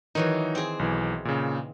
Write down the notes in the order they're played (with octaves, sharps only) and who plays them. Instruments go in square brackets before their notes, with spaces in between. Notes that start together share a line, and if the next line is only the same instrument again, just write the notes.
[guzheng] D#3 E3 F#3 [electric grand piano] D#4 C#5
[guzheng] C4 G#4
[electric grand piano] B1 E3
A#2 C#3